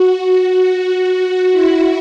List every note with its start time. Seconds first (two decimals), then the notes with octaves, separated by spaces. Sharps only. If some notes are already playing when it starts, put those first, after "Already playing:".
Already playing: F#4
0.60 F#4
1.51 E4